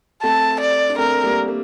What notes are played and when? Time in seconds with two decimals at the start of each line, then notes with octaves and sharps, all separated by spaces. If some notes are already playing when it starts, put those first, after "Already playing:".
0.23 A3 C4 A5
0.61 D5
0.90 D4
0.98 A3 C4 A#4
1.23 G3 A#3
1.48 G3 A#3